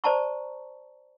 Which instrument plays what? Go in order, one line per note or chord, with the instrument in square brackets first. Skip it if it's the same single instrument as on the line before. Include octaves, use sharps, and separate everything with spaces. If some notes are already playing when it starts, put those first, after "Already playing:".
[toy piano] C5 D5 A5 A#5 C#6